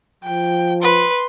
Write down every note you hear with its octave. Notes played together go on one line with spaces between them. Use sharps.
F3 G5
B4 C6